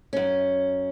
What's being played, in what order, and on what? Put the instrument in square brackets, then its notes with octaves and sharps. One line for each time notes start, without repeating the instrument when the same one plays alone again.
[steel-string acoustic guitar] F#2 C#4